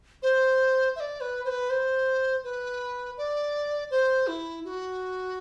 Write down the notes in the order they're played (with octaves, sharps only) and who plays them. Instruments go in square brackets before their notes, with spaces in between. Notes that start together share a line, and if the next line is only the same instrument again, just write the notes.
[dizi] C5
E5
D5
B4
C5
B4
C5
B4
D5
C5
E4
F#4